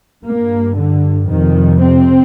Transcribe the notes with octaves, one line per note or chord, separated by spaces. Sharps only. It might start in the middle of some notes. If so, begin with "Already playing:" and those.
G2 A#3
D3
F2 C3 D#3
C4